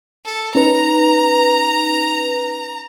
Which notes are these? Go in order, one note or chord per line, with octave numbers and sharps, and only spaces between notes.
A4
C#4 D#4 B4 A#5